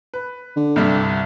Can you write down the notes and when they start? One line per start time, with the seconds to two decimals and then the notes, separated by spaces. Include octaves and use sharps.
0.14 B4
0.56 D3
0.76 C2 G2 G3